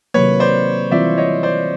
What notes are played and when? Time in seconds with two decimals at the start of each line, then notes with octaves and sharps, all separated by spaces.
0.14 C3 D#3 F#3 A#3 B4 C#5
0.40 C5 D5
0.91 E3 G3 C4 F4 D5 E5
1.18 C#5 D#5
1.43 C5 D5